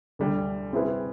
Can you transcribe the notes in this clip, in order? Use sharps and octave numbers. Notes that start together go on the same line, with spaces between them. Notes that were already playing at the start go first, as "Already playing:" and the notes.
D2 D3 G3
G3 C4 E4 G#4 B4